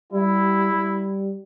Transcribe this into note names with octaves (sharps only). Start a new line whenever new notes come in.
G3 E4
G3